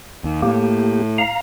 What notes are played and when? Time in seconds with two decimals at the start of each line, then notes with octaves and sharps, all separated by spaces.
0.24 D#2
0.42 A2 A#3 G4
1.18 F5 A#5